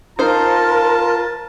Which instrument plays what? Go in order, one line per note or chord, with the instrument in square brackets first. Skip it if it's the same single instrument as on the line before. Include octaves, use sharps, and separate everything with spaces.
[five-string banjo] D#4 C5 [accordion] F4 [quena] A#4 [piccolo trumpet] A5